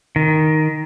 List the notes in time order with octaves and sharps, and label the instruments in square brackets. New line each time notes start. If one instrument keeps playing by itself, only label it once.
[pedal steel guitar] D#3